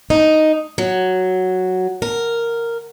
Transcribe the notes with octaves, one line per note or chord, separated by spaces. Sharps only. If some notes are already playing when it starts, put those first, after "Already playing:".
D#4
F#3
A#4